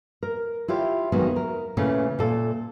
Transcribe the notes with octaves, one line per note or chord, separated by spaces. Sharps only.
A#4
E4 F4 G4 C#5
F2 D#3 F#3 G#3 B3
A#4
A#2 C#3 E3 A3 C#4
A#2 A4